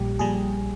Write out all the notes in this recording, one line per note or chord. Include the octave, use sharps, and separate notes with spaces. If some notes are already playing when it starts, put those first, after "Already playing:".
Already playing: A#1 A#2 G3 G4
A#1 A#2 G3 G#4